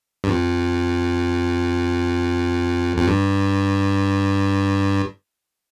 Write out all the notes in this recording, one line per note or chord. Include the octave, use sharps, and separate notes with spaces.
G2
F2
F2
G2